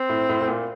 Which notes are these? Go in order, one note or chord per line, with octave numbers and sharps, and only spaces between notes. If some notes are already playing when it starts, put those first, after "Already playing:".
Already playing: C4
A2
A2
A2
A#2